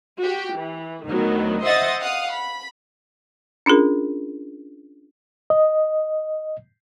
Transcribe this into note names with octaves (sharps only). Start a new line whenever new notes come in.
F#4 G4
E3
D2 D#3 F#3 B3
C5 D#5 E5 F#5 D#6 A6
F5 F#5 D#6
B5
C#4 D4 F4 G#4 A#4
D#5